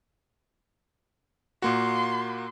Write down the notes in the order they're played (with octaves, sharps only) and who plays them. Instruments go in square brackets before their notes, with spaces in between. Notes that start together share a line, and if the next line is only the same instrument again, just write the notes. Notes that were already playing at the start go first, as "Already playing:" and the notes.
[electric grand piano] A#2 A#3 F#4 [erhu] C6